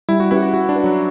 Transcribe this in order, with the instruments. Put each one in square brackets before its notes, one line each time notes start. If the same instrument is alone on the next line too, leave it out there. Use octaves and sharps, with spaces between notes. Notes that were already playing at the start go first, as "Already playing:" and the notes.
[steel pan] G3 [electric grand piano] E4
[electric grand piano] F#4
[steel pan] C#4 G4 B4 F#5 [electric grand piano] E4
[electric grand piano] F#4
[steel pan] E4 [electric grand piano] F#4
[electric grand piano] D4
[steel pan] B4 F#5
[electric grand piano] F#3